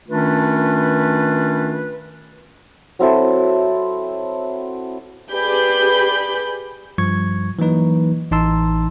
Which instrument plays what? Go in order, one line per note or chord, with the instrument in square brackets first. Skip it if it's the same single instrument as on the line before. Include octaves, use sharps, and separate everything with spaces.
[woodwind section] D#3 A3 C#4 D4 F4 B4
[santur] F#3 C4 E4 A4
[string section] G4 G#4 B4 D5 B5 G6
[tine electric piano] G2 F3 G3 C#6 G#6
E3 F#3 A#3 D#4 B4
A1 E3 D#4 A5 C6 E6